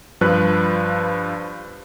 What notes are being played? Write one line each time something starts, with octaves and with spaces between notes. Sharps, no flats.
G2 F3 B4 F#6